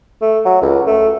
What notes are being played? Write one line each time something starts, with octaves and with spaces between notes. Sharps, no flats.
A3
F#3
C#2
A3